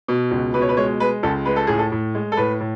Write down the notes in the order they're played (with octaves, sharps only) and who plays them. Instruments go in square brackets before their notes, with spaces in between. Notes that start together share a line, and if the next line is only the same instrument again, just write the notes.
[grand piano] B2
C#2
B2 B4
C#5
B4
G#3 C#5
G#3 B4
C#2 A4
G#3 B4
A4
A2 G#4
A4
A2
G#3
A4
A2 B4
A2